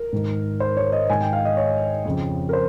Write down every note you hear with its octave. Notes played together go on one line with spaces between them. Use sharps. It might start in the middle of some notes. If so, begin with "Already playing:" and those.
Already playing: A#4
G#2 D#3
C5
C#5
D#5
G#2 D#3 G#5
G5
F5
D#5
C#5
F2 C#3
A#4
C5